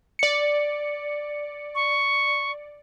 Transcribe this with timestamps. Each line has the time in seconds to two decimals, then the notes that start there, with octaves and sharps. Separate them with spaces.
0.19 D5 C#7
1.75 C#6